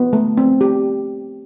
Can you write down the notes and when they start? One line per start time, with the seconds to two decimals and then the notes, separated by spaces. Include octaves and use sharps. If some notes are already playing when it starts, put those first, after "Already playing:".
Already playing: B3
0.13 A3
0.38 C4
0.61 G4